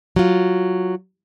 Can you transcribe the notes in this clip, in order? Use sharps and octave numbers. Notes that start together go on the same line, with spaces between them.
F#3 F4